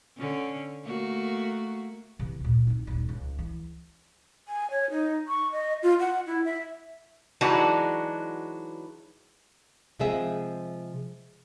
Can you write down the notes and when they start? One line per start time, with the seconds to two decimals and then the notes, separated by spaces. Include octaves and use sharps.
0.18 D3 C#4
0.84 A3 A#3 F#4
2.19 C3 E3
2.40 D2 A#2
2.67 C4 D#4
2.87 D#1 D#4
3.09 C#2
3.39 E3
4.48 G#5
4.71 C#5
4.91 D#4
5.28 C#6
5.52 D#5
5.83 F4
6.00 F#5
6.27 E4
6.45 E5
7.41 E3 F#3 G#3 D4 D#4 F#4
9.99 C3 F3 G#3 C4 G#4 E5